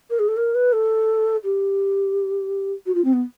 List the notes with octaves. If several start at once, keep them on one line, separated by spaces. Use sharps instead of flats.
A#4
G#4
A4
A#4
B4
A4
G4
F#4
F4
C4
B3